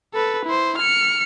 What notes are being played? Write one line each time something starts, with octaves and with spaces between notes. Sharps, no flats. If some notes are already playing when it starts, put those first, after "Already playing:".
A4 B4
E4 C5
F6 C#7